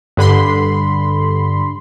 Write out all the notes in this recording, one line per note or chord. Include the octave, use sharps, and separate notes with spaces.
G2 D3 B5 C6